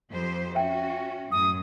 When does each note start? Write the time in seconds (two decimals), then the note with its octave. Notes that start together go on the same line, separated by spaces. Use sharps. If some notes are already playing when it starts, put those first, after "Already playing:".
0.11 F2 G4 C5
0.55 C#4 F#4 E5 G5
1.32 F#2 A2 D#6